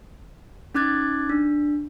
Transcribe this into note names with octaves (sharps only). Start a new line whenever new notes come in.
C#4 D#4 D6 F#6 G#6 A6
D4